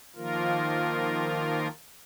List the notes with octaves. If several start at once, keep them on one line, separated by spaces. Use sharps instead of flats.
D#3 F3 A#3 F4 A#4